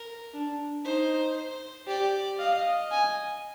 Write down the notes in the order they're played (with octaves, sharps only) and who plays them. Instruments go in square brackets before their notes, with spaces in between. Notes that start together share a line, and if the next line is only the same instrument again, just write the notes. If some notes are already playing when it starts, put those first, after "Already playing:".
Already playing: [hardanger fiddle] A#4
[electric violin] D4
[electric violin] D#4 [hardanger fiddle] C5
[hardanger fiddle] C5
[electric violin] G4 [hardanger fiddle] D5
[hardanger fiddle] D#5 [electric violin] F5
[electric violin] G#5